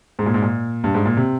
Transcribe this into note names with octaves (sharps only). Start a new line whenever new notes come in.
G#2
A#2
G#2
A#2
G2
G#2
A#2
C3